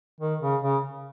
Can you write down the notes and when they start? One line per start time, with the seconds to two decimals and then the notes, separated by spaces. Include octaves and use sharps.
0.20 D#3
0.41 C#3
0.62 C#3